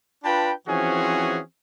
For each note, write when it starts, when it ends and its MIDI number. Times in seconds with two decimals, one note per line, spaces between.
0.24 0.52 62
0.24 0.52 65
0.24 0.52 71
0.24 0.52 79
0.24 0.52 81
0.24 0.52 83
0.67 1.40 52
0.67 1.40 53
0.67 1.40 60
0.67 1.40 61
0.67 1.40 66
0.67 1.40 68